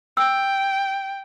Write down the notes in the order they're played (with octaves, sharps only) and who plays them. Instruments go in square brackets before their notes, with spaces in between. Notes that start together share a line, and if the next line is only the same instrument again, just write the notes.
[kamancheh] G5 [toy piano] E6